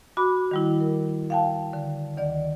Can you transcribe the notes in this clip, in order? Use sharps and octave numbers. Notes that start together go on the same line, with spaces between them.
F#4 B5 D6
D#3 G3 E4
A#4
F5 G5 A5
D3
D2 D#3 D5